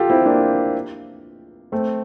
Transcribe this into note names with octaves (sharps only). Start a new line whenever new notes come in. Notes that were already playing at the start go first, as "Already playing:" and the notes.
Already playing: F4 G4 A4
C4 E4
A#3 D4
A3 C4